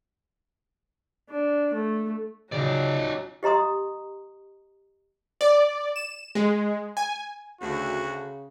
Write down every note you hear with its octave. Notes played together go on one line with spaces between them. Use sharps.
D4
A3
C#3 F#3 D#4 D5
G4 D#5 A#5 C6 D#6
D5
E7
G#3
G#5
D2 C#3 F#4